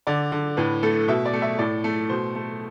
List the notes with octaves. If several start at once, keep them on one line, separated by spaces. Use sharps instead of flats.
D3 D5
D3
A2 B4
A3 A4
B2 E5
D5
A3
E5
A2 D5
A3
B2 C5
A3